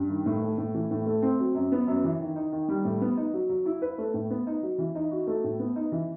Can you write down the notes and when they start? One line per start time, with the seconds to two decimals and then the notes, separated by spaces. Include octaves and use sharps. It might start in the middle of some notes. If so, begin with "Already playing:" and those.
Already playing: G2
0.10 D#3
0.26 A2
0.42 A3
0.58 A2
0.74 E3
0.91 A2
1.06 A3
1.22 C4
1.39 F#3
1.55 F#2
1.72 B3
1.87 F#2
2.04 E3
2.20 D#3
2.36 D#4
2.52 D#3
2.68 G3
2.85 A2
3.01 B3
3.17 D#4
3.33 F#3
3.49 F#3
3.66 E4
3.82 B4
3.98 A3
4.14 A2
4.30 B3
4.47 D#4
4.62 F#3
4.78 E3
4.95 D#4
5.11 F#4
5.27 A3
5.44 A2
5.59 B3
5.76 D#4
5.92 E3